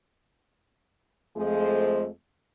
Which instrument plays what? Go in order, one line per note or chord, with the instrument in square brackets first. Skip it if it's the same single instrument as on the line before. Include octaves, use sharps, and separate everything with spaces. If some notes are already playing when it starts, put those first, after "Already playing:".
[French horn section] F2 F3 G#3 A3 G#4 C5